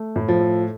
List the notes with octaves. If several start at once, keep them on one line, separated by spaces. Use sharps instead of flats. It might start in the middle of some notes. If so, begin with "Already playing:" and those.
Already playing: A3
A2
F3
A4